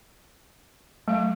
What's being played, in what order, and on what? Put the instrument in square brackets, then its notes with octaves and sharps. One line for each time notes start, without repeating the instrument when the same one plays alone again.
[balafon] F#3 F5 [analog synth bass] A3